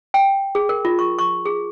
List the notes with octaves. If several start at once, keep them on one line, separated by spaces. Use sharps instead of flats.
G5
G#4
A#4
F4
C#6
C#6
G#4